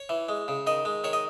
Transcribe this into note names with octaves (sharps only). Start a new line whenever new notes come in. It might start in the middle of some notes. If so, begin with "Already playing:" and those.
Already playing: C#5
E3
G#3
C#3
D#3 D#5
G#3
D#3 C#5
D#5